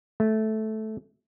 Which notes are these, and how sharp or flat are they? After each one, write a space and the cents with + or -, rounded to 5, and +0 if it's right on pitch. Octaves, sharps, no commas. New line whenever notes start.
A3 -10